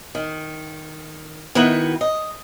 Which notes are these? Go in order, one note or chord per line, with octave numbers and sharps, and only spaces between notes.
D#3
D#3 B3 E4 F#4 B4 G5
D#5